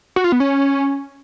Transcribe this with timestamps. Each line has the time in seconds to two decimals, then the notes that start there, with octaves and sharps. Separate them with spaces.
0.16 F#4
0.24 F4
0.32 B3
0.40 C#4